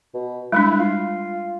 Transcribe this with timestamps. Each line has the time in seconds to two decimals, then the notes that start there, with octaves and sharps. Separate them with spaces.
0.14 B2
0.52 G3 G#3 D4 E4
0.79 F4